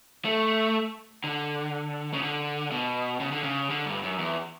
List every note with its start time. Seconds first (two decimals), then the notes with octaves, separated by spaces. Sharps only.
0.25 A3
1.24 D3
2.13 C#3
2.22 D3
2.71 B2
3.20 C#3
3.32 D3
3.44 C#3
3.70 D3
3.86 G2
4.03 F#2
4.18 E2